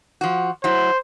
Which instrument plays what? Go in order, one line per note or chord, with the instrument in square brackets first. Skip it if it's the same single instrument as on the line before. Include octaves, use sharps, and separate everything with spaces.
[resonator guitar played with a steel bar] F3 F#4
[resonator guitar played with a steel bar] F#3 E4 [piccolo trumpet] C5